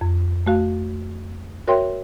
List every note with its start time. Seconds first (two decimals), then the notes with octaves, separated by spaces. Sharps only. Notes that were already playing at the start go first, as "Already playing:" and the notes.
0.01 F2
0.46 A3 F#4 F5
1.68 F#4 A#4 C#5 E5 G5 C6